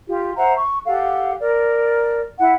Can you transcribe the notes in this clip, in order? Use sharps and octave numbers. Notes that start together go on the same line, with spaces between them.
F4 G4
C5 E5 F#5 A#5
C#6
G4 A4 F5 F#5
A#4 D5
E4 F#5